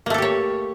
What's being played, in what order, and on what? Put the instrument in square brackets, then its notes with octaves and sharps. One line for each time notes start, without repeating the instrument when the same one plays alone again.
[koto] A#3
A3
A4
G4
C#5